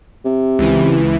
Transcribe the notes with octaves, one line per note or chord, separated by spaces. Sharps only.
C3
C#2 E3